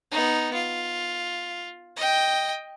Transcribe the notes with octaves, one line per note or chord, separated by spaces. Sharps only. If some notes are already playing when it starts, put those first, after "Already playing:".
B3 D#4
F4
D#5 G5